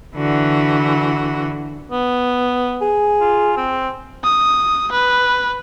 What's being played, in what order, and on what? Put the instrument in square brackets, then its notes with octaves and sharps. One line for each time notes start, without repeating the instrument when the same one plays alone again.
[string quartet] D3 E3 F#4
[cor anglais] B3
[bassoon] G#4
[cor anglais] F4
C4
[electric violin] D#6
B4